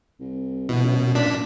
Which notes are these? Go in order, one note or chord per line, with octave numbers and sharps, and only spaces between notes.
C2
B2 E3
F#2
A#2 D4 B6